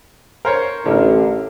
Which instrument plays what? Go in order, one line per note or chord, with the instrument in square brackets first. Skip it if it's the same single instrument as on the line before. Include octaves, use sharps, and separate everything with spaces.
[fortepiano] A#4 C5 C#5
[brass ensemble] A1 [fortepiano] D3 A#4